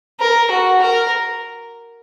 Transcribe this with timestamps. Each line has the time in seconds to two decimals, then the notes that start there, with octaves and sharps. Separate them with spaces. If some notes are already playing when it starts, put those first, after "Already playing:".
0.20 A#4
0.51 F#4
0.81 A#4